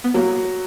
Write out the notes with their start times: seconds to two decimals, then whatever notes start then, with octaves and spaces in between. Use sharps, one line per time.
0.04 B3
0.14 F#3 A#3